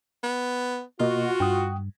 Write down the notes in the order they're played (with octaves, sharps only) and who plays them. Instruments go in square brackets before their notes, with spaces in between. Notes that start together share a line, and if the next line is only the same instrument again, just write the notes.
[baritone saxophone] B3
[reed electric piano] B2 A#3 D#5 [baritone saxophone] F4 [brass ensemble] F#4
[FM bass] G2 [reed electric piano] G5 D#6